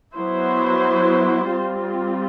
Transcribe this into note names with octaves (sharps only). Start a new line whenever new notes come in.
F#3 B3 E4 C5
G3 C4 F4